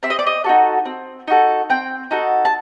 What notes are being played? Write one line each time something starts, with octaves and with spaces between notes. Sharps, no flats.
C4 E5
D#5
D5
D#5
D#4 F#4 A4
C4
D#4 F#4 A4
C4 G5
D#4 F#4 A4
A5